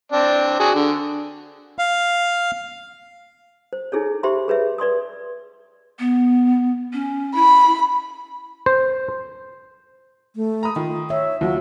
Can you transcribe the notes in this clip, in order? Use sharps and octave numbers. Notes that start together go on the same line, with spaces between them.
C4 D4
F#4 G#4
D3
F5
C5
D#4 E4 G#4 A4 C#5
G4 C5 E5 B5 C6
G#4 B4 C#5 E5
B4 D5 C6 D#6
B3
C#4
E4 B5
C5
A3
A#5 B5 D#6
D#3 F4
C#5 E5
D#2 F#3 F4 F#4